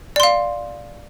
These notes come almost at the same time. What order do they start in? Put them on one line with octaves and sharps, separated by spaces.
D5 C6 F5